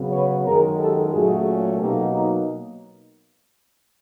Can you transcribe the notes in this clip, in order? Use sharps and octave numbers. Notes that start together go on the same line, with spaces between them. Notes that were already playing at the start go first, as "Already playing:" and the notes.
Already playing: C#3 F#3 B3
B4 C#5
F#2 D#3 G#3 G#4 A#4
G4 A4
A#2 F#3 A3 C#4 F#4 G#4
B2 F#3 A#3 D#4 G4 A4
D#4